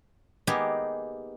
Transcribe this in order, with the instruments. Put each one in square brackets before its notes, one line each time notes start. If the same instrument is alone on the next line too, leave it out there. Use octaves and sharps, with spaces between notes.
[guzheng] A#3 B3 D#4 G4 G#4